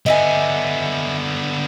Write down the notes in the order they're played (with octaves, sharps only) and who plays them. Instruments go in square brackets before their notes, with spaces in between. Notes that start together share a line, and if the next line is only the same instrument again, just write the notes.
[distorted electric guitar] D3 B3 [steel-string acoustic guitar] D#5 E5 G#5